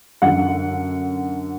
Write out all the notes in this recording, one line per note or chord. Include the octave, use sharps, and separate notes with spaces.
F#2 D3 F#5